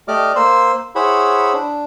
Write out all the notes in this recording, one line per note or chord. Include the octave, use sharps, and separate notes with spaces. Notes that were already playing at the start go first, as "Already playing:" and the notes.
A3 G4 D5 D#5 D6 F6
A#3 C5 C6 E6
E4 G#4 C5 C#5 F#5 B5
D4